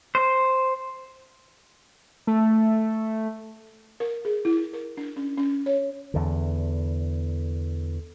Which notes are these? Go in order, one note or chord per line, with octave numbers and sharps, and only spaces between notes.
C5
A3
A#4
G#4
E4
E4
A#4
D4
C#4
C#4
C#5
E2 D3